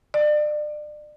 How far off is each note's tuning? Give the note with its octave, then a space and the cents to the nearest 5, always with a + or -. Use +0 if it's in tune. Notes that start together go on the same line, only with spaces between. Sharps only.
D5 +35